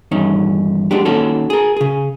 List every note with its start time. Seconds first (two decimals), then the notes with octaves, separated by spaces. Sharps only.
0.11 E2 G2 D#3 C#4 D#4
0.91 F#3 G#3 D4 G4
1.05 D#3 A#3 C#4 F#4 A4
1.50 G#4 A#4
1.77 C#3 G#4